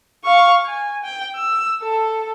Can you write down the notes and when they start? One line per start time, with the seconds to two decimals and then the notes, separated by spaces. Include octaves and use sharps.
0.25 F5 C#6
0.66 G#5
1.03 G5
1.36 E6
1.82 A4